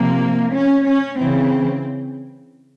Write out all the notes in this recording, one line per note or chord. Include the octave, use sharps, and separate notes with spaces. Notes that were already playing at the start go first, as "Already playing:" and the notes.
Already playing: C3 F3 A#3
C#4
C#4
C#3 E3 C4